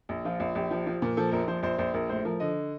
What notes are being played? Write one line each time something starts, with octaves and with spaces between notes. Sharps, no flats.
A#1
F3 F4
A#1
A#1 G4
F3
F3
A#2
F3 A4
A#1 A#4
F3 C5
A#1 C5
A#1 C5
A#1 A#4
A2 C5
F3 A#4
D3 D#5